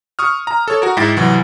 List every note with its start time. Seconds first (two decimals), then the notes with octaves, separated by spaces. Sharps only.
0.19 C#6 D#6 F6
0.47 A#5
0.68 A4 C#5
0.82 F#4 A#4
0.97 G#2 E4 E5 G5 A6 A#6
1.17 C2 E3 F#3